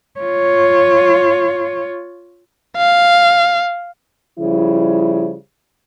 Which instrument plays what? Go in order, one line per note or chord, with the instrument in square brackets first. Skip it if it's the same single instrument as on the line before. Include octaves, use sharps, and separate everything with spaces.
[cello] F4 C#5
[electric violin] F5
[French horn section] C#3 F3 G3 E4